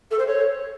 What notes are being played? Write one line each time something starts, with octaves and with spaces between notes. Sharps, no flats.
A4
C5
C#5